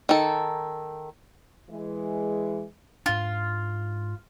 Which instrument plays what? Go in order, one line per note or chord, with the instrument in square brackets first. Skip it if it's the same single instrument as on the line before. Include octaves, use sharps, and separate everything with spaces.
[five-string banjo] D#3 A4
[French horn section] E3 G#3
[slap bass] G#2 D4 [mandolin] F4